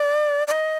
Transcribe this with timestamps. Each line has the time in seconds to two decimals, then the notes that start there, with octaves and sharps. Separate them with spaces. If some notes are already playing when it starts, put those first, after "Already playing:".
Already playing: D5
0.47 D5
0.51 D#5